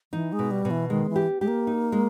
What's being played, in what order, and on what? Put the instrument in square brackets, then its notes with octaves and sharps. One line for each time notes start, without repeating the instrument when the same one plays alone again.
[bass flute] E3 [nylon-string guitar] D#4
[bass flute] G#3
[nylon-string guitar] B2
[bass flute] G3
[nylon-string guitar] B2
[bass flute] E3
[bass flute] D#3 [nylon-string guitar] G#3
[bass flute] E3
[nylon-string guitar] G4
[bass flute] G#3 [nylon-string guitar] G4
[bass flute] A#3
[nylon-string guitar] D#4
G#3